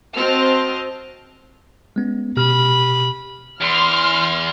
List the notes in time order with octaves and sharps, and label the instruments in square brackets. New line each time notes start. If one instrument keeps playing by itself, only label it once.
[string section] C4 F#4 C5 D#5 A5 F6
[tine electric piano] G#3 B3 C#4
[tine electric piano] B2 G4 F6 [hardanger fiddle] B5
[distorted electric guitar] E2 [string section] C6 F6